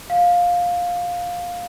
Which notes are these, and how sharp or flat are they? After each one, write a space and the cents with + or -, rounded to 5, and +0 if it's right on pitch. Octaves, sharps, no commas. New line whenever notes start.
F5 +15